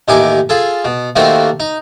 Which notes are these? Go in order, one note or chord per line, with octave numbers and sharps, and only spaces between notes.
A1 D#2 D#4 E4 G#5 D6
F4 G#4 A4
B2
D#2 A3 A#3 C4 F#4 A4
D#4